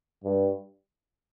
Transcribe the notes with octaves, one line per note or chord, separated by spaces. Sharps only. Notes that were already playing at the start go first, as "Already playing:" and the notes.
G2